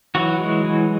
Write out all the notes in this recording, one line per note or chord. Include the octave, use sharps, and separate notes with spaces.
E3 F#3 F#4
G#3
E3